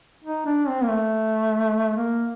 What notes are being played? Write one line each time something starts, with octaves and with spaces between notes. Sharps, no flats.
D#4
D4
C4
A#3
A3
A#3